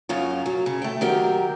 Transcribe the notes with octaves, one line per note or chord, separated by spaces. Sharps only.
F#2 C#3 F4
F#3
C#3
A3 G5
D#3 F#3 G4 A#4